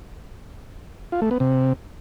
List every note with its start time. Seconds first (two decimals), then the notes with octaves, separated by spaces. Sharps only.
1.12 F4
1.22 A3
1.31 B3
1.40 C3